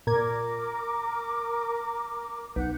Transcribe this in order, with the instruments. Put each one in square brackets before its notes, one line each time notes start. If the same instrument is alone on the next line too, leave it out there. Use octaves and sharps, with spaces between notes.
[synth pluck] A#2 G#6 [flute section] A#4 D6
[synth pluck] B1 [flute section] F#5 G6